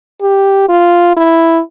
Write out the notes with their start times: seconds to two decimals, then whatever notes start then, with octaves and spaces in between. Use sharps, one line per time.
0.22 G4
0.69 F4
1.17 E4